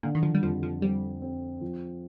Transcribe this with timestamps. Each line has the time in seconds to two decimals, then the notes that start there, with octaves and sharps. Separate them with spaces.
0.03 A#2 D3
0.15 D#3
0.23 F3
0.34 G3
0.42 F2 F3
0.63 F3
0.82 G3 C4
1.22 C4
1.61 F3